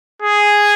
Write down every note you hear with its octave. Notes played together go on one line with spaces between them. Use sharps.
G#4